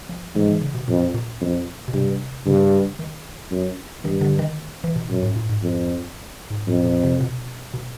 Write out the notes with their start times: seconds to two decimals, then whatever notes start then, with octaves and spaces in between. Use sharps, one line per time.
0.09 F3
0.35 G#2 E3
0.48 E3
0.61 C#3
0.75 B2
0.88 F2 A#2
1.14 A#2
1.41 F2
1.88 B2
1.94 G2 C3
2.46 G2 C#3
2.99 D#3
3.51 F#2
4.04 G2 D#3
4.21 D3
4.39 D#3
4.84 E3
4.96 B2
5.09 F#2 A#2
5.23 G#2
5.36 A2
5.49 G#2
5.63 F2
6.51 G#2
6.67 F2 A2
6.85 A#2
7.03 C3
7.21 B2
7.74 B2